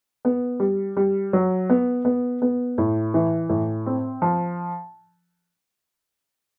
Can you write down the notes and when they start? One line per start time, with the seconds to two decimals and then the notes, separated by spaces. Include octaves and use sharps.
0.25 B3
0.60 G3
0.97 G3
1.33 F#3
1.70 B3
2.05 B3
2.42 B3
2.78 A2
3.14 E3
3.49 A2
3.86 C4
4.22 F3